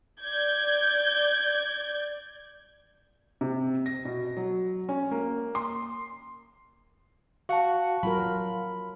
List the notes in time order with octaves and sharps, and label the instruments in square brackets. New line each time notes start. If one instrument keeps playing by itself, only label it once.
[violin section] D5 G6 G#6
[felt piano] C3
A#6
B2
F#3
C#4
A#3
C6
[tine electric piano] F#4 F#5 [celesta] F5 A5
[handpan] F#3 F4 A#4 [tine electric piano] B5